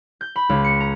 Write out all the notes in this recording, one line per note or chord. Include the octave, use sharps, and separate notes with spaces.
G6
B5
C#2
C#7
A#5